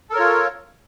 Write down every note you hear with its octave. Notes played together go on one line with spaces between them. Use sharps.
F4 A4 A#4 C#5